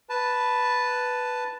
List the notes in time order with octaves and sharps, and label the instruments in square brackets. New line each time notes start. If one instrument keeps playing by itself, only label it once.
[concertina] B4 A5